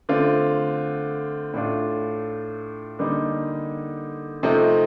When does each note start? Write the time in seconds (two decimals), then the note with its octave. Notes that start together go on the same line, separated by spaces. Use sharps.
0.09 D3 A3 C4 F4
1.54 A2 A3 D4 F4
2.99 D3 G3 A#3 D#4
4.43 C3 F3 A3 C4 D#4